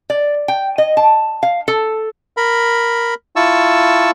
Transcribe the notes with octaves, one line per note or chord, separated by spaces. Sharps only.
D5
G5
D#5
A5
F5
A4
A#4 B5
E4 F4 A5 C#6 E6